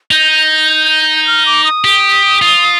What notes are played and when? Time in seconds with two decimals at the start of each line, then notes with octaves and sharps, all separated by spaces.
0.11 D#4 G6
1.27 F6
1.46 D6
1.64 D#6
1.84 G4
2.42 F4